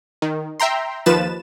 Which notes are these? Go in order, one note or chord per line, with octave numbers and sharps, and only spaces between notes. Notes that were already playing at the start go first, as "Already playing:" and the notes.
D#3
E5 G5 A#5 C6
D#2 F3 B4 A6 E7